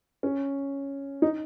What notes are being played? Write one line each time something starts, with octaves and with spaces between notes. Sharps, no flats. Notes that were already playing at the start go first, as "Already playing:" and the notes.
C#4
D#4